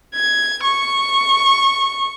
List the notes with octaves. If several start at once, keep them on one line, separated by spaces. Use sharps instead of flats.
G#6
C#6